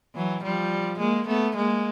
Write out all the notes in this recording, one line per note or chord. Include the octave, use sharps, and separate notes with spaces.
E3 F#3
F3 G3
G#3 A#3
A3 B3
G#3 A#3